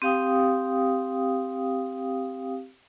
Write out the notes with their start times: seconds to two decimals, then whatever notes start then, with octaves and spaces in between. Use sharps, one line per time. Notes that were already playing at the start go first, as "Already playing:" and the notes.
0.02 C4 G4 F5 G5 D#6